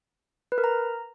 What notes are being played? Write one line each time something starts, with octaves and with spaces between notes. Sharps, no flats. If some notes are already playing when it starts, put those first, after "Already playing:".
B4
A#4
A#5